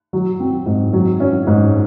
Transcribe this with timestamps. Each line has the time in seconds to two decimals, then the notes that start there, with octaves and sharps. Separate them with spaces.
0.13 F#3
0.40 C4
0.66 G#2
0.93 F#3
1.20 C#4
1.47 G#2